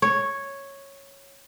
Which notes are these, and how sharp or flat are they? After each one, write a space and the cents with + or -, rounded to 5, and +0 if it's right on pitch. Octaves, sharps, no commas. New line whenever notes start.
C#5 -5